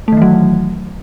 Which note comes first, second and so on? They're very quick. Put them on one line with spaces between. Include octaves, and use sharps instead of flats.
A3 D#3 E3 F#3